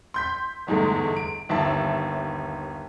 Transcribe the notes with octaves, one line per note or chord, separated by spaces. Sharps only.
C6 G6 B6
G1 E2 G#2 G#3 A3
D7
G1 D#2 E5 A5